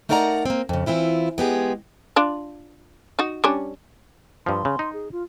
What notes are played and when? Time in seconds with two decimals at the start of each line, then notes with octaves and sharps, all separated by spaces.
0.09 A3 D#4 A#4 D5 F#5 A#5
0.46 A#3 C4
0.69 F2 C#3
0.86 E3 C4 E4 F4
1.38 G#3 B3 G4 G#4
2.16 D4 F4
3.19 D#4 F#4
3.44 G3 C#4 D4
4.46 G2 F3 C6
4.65 C#3
4.79 D#4
4.93 G#4
5.12 F4